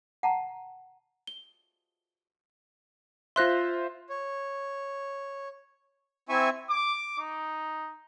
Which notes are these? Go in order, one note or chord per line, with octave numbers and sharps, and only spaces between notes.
F#5 A5 A#5
G7
F4 C5 E5 C6 F#6 A#6
C#5
C4 E4 E5 G#5 C#6
D6
D#4